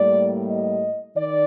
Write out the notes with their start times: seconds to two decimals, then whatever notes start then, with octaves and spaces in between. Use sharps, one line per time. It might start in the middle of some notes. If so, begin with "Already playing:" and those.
Already playing: A2 G3 A#3 D5
0.48 D#5
1.16 D#3 D5